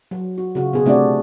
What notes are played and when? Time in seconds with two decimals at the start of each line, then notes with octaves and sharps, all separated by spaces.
0.11 F#3
0.38 F#4
0.55 C#3 F4 F#4
0.73 B2 F#4 G#4
0.86 C3 A3 D4 F#4 D5